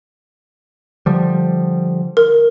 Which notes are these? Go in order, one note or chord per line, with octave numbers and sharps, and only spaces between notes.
D3 F3 G3
A#4